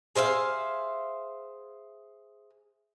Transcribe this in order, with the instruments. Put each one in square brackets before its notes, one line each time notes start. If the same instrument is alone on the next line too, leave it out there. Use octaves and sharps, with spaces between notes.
[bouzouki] G#4 C5 E5 F5